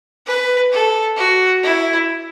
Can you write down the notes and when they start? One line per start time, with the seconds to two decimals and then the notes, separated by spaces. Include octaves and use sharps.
0.27 B4
0.72 A4
1.17 F#4
1.63 E4